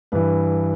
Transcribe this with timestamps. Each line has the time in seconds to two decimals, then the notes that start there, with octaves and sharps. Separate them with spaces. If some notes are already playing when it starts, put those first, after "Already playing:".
0.12 G2 E3 B4